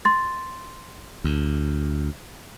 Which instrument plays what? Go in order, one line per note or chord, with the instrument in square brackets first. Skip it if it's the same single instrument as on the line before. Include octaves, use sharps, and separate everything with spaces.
[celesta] C6 A6
[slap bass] D2